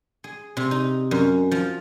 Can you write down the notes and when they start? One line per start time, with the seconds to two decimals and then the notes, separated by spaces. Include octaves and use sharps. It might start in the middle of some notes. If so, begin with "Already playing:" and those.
0.24 G#4
0.57 C3
0.71 D#4
1.11 F#2
1.51 F3